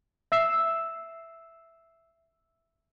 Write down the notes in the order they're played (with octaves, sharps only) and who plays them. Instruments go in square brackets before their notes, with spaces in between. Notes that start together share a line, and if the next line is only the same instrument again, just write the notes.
[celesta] E5 E6 C7 E7